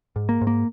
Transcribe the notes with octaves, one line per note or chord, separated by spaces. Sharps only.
G#2
A#3
G#2
A#3